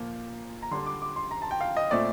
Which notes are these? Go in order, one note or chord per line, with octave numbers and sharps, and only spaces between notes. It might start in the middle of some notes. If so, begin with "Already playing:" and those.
Already playing: A#2 F3 A#3
A#5
D3 G3 D4 C6
D6
D6
C6
A#5
A5
G5
F5
D#5
A#2 A3 C4 D5